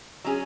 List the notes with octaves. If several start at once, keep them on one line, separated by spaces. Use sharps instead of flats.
F#3 C#4 G#4